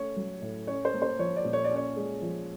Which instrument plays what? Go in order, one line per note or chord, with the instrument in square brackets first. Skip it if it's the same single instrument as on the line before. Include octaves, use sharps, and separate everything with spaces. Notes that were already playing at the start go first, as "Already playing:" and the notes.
Already playing: [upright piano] A3 C#4 C#5
F#3
A2
C#4 C#5
C5
A#3
C5
F3 C#5
D5
A#2
C#5
D5
C#4
C#5
G#3
F3